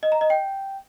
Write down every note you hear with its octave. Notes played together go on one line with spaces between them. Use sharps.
D#5
A#5
D#5
G5